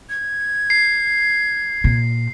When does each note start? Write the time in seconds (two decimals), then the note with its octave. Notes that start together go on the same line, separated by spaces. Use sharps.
0.10 G#6
0.70 C7
1.84 A#2